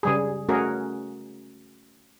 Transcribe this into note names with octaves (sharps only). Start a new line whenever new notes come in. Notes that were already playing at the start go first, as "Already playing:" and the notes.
C#3 G3 G#4
A3 C#4 F#4 G#4 A#4